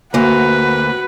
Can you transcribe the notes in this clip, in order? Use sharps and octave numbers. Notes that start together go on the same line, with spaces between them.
D2 A#3 F#4 B4